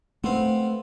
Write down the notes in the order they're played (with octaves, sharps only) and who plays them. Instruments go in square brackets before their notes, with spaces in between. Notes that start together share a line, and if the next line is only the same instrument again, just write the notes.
[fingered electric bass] A3 [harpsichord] B3 C4 F5